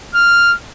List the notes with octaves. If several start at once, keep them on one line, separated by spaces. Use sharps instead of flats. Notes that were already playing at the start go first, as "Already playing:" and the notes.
F6